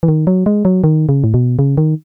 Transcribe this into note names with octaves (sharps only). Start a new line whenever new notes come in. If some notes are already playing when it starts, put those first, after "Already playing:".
E3
D#3
F#3
G#3
F#3
D#3
C#3
A2
B2
C#3
D#3